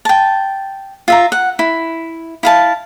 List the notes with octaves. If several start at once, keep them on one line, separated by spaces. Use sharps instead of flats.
G5 A5
F4 E5 A#5
F#5
E4
E4 F5 A5